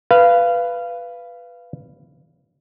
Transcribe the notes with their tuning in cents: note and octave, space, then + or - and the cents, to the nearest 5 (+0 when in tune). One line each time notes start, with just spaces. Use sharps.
B4 +0 F5 -20